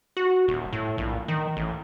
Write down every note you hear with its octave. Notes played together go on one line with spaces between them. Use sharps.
F#4
D#1
A2
A#1
D#3
A1